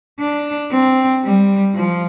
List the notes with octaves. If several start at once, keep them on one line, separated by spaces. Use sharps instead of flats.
D4
C4
G3
F3